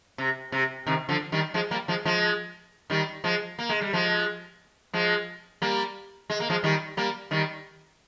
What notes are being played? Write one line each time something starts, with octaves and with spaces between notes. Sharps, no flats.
C3
C3
C3 D#3
D3 F3
D#3 G3
F3 G#3
G3 A#3
F3 G#3
F3 G#3
D#3 G3
F3 G#3
A#3
G#3
G3
F3 G#3
F3 G#3
G3 A#3
G#3
A#3
F3 G#3
D#3 G3
G3 A#3
D#3 G3